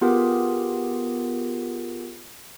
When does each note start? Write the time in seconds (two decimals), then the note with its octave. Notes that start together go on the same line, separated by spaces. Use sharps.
0.01 B3 F4 G4 G#4 A#4